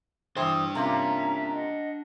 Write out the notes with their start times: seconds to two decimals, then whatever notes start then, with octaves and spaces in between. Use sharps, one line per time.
0.36 E3 D4 C5 G5 D#6 E6
0.75 C3 A#3 C#4 F4 E5 A#5
1.52 D#5 F#5